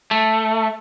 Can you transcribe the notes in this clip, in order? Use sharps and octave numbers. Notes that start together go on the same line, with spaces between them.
A3